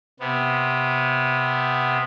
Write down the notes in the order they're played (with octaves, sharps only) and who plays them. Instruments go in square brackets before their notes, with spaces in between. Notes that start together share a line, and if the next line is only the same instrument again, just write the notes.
[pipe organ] C3 B3